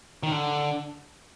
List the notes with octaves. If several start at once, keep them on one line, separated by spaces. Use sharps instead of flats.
D#3
D3